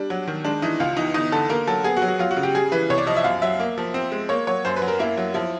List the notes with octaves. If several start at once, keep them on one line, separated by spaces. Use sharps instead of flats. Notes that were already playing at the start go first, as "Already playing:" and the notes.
Already playing: G3 D4
F#3
D#3
G#3 D4
E3 D#4
C#2 F4
E3 D#4
G1 D#4
D3 A4
A#3 A#4
F#3 A4
B3 G#4
F#4
F#3
F#4
F#3 F4
F#4
C#3
G4
G3 G#4
E3 B4
C2 C#5
D5
F3 D#5
E5
F#2 F5
F#3 E5
A#3
F3
C4
G#3
A#3 C#5
F#3 C#5
F#2 C5
B4
F#3
A#4
A#3 E4
F#3
F3 E4